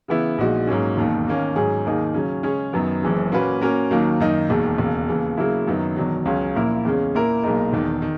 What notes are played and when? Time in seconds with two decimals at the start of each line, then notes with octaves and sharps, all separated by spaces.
0.08 C#3 E3 B3 E4
0.38 A#1 A#2 G#3 D#4 F#4
0.67 G#2 F#3 A#3 C#4
0.97 E1 D#2 D#3
1.26 D#2 D#3 A#3 C#4
1.56 G#2 F#3 C#4 G#4
1.85 D#2 D#3 A#3 D#4 G#4
2.14 C#3 F#3 C#4
2.43 C#3 G#3 C#4 G#4 C#5
2.73 F#2 D#3 F#3 B3
3.02 F#1 F#2 E3 G#3 C#4
3.32 A#2 A#3 C#4 F#4 B4
3.61 A#2 A#3 C#4 F#4 A#4
3.90 D#2 D#3 F#3 A#3
4.20 F#2 D#3 A#3 D#4
4.49 E1 D#2 D#3 G#3
4.78 E1 D#2 C#3
5.08 D#2 C#3 E3
5.37 C#3 F#3 A#3 E4
5.67 F#2 D#3 F#3 B3
5.96 E1 E2 D#3 F#3
6.26 C#2 C#3 F#3 C#4
6.55 A#1 A#2 A#3 E4 A#4
6.85 E2 C#3 G#3 C#4
7.14 A#2 A#3 E4 A#4
7.44 B1 A#2 G#3 D#4 A#4
7.73 E1 E2 D#3
8.02 D#3